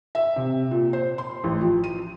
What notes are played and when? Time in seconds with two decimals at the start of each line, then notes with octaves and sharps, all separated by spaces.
0.15 E5
0.36 C3
0.71 A#2
0.93 C5
1.18 C6
1.44 A1
1.61 F3
1.84 D#7